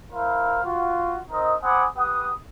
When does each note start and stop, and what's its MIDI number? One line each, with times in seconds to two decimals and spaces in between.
0.13 0.61 64
0.13 0.61 70
0.13 0.61 72
0.13 0.61 77
0.64 1.19 65
0.64 1.19 66
1.31 1.55 60
1.31 1.55 63
1.31 1.55 70
1.31 1.55 75
1.63 1.84 60
1.63 1.84 78
1.63 1.84 80
1.63 1.84 83
1.63 1.84 86
1.63 1.84 87
1.96 2.31 67
1.96 2.31 71
1.96 2.31 78
1.96 2.31 87